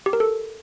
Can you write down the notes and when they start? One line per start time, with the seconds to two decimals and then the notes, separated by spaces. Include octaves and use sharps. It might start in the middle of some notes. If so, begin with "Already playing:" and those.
0.06 G4
0.13 A#4
0.20 A4